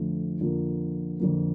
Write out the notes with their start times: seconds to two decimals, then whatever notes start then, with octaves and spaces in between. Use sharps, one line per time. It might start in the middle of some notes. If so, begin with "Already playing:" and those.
Already playing: F2 D3 F3 A3
0.41 F2 D3 F3 A#3
1.20 F2 D3 F3 A#3